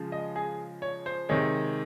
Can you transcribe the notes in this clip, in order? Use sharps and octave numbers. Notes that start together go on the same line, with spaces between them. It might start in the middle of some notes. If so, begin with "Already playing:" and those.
Already playing: C#3 F3 G#3
D#5
G#4
C#5
C5
C3 D#3 G#3 C#5